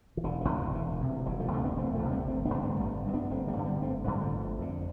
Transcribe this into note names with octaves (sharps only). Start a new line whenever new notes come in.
E3
E1 D3
E3
D2
C3 E3
E1 E3
D2 C3
E1 E3 G3
F3 A3
D2 C3 A3 C4
B3 D4
E1 A3 C4
F3 A3
D2 C3
G3 B3
G1 A3 C4
B3 D4
G2 D3
A3 C4
G1 G3 B3
G2 D3
B3 D4
G1 A3 C4
G3 B3
G2 D3
G3 B3
G1 A3 C4
G2 D3 G3 B3
F3 A3
G1
F2 D3